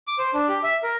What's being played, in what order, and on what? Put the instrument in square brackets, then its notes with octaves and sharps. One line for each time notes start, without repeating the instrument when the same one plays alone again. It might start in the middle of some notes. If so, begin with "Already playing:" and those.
[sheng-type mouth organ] D6
C5
D4
G4
E5
A#4